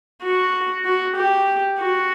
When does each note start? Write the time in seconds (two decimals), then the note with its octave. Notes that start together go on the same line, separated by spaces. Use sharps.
0.23 F#4
0.85 F#4
1.16 G4
1.79 F#4